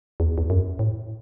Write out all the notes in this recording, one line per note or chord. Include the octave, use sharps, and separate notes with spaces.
E2
E2
F#2
A2